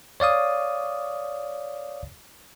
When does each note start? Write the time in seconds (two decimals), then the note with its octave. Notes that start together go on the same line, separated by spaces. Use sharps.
0.20 C#5 D5 F5 D#6